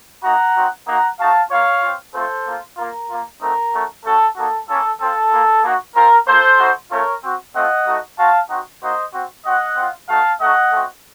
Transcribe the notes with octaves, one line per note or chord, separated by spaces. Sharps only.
A#3 D#4 F#4 F#5 A#5
C4 D#4 F#4
A#3 D#4 F#4 F#5 A#5
A3 D#4 F#4 F5 A5
A#3 F4 C#5 F5
C4 F4
A3 C4 F4 A4 C5
A#3 F4
A#3 F4 A#4
A#3 F4
A3 C4 D#4 F#4 A#4
A3 C#4 F#4
A3 C#4 F#4 A4
A#3 D#4 F#4 A4
A#3 C#4 F4 A4
C4 F4 A4
A#3 F4
A#3 D#4 F#4
C4 F4 A#4
A#3 F4 A4 C5
A3 D#4 F#4
A3 C#4 F4 A#4 C#5
C4 F#4
A3 C4 F4 D#5 F#5
A3 D#4 F#4
C4 F#4 F5 A5
C4 D#4 F#4
A#3 D#4 F#4 C5 D#5
C4 F#4
C4 F#4 D#5 F#5
C4 F4
A3 D#4 F#4 F5 A5
A3 D#4 F#4 D#5 F#5
A3 C4 F#4